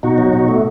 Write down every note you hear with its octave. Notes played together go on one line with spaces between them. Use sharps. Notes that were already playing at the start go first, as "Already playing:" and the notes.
B2 D#4 F#4
F#3
B2
A3